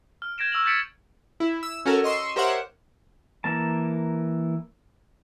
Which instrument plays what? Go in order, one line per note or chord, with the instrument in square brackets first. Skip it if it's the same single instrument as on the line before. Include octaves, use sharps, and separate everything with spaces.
[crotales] F6
G6 G#6 A#6 D7 E7
C#6 E6 F7 F#7
G6 A6 B6 C#7 D7 E7
[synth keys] E4
E6
C#4 F#4 A4 A#4
D#5 C6 C#6 E6
G4 A#4 C5 C#5 E5 F#5
[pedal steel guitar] E3 A#3 A#4 A5